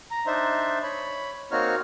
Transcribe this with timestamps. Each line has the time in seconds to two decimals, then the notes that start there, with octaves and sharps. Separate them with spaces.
0.11 A#5
0.26 D4 D#4 C5 E5
0.83 C#5 B5
1.51 A#3 C4 D#4 F#4 C#5 F6